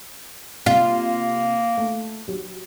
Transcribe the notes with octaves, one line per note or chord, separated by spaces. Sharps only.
C3 A#3 F4
A3
F#3 G4